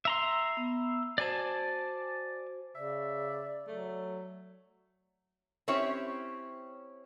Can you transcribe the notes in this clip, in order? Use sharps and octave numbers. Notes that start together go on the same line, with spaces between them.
E5 A#5 C6
B3
F#4 C5 D5 G#5 A5
C#3 D5 E5
F#3 A3
C4 C#4 E4 G4 C#5